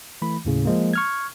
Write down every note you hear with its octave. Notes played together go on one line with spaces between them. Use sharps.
E3 A3 B5
D#2 A2 C#3
F3 G#3 A#3
C#6 F6 G#6